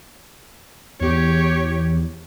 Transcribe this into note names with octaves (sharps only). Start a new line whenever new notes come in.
E2 G4 C#5